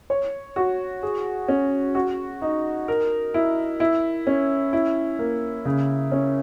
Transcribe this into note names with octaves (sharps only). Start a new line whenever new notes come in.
C#5
F#4
G#4
C#4
F#4
D#4
A#4
E4
E4
C#4
E4
A#3
C#3
C#4